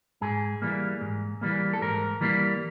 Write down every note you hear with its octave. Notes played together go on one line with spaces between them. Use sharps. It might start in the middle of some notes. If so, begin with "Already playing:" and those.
G#2 G#4
E3 G3 A#3
G#2
E3 G3 A#3
A4
G#2 A#4
E3 G3 A#3